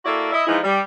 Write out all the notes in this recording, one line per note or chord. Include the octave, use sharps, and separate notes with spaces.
A#3 E4 F#4 A4 D5
E4 D#5 E5
E3 F3 G#3 D#4 E4
G3